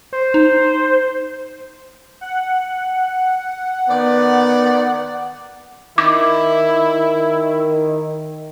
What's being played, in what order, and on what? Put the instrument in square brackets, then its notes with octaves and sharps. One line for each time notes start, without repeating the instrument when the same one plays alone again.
[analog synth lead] C5
[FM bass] D#4
[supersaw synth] F#5
[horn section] D#3 B3 D5
[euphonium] D#3 [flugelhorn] E4 [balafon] D6